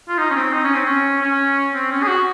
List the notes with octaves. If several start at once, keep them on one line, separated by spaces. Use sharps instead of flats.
F4
D#4
C#4
C4
D#4
C#4
C4
C#4
C#4
C4
C#4
G#4
F#4